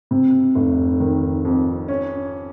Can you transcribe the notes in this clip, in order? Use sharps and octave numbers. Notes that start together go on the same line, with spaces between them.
C3
F1
D#3
F2
C#4